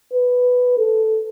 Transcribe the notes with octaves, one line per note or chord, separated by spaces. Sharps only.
B4
A4